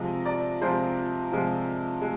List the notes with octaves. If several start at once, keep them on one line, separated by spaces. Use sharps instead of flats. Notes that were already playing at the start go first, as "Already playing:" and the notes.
Already playing: C3 F3 G#3 D#5
D5
C3 F3 G#3 C5
C3 F3 G#3
G#3